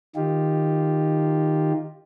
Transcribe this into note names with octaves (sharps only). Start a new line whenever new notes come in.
D#3 D#4 F4 G4